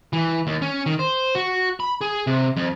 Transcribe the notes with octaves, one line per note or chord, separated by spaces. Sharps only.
E3
D#2
C#4
D#3
C5
F#4
B5
G#4
C3
F2